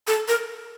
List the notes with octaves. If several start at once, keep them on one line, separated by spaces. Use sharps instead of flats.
A4
A#4